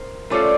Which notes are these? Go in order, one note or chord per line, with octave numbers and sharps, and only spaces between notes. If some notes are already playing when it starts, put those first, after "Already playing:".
Already playing: A#4 C5
A3 C#4 F4 A4 C5 D5